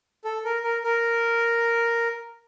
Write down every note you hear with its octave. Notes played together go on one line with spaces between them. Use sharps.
A4
A#4
A#4
A#4